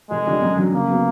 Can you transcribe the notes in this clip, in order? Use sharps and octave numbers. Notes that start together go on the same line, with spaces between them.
F1 G#3
F2 D3 G3
F#2
D3 F#3
C#3 A#3
F#3 B3